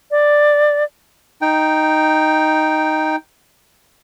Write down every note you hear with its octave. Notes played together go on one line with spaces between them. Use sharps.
D5
D#4 G5